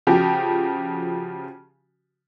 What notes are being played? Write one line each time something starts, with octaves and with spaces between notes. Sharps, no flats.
C#3 F3 F#4 G4